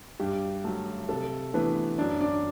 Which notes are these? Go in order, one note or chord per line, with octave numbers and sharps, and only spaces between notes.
G2 G4
F#3 A3
C3 A4
E3 A3 B3 D4 B4
F#2 D4 D5
D4 D5